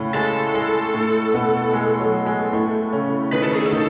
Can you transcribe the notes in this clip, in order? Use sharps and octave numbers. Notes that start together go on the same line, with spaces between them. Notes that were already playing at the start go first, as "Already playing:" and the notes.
Already playing: A2 C#3 A3 C#4
G#3 A4
G#3
A2 A3
B2 B3
G#3
F#3
G#3
A2 A3
C#3 C#4
D#3 D#4 B4
A4
G#4
A4
D#3 D#4